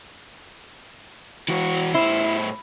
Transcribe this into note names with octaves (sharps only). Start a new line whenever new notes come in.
E3 F#4
A2 E4 C5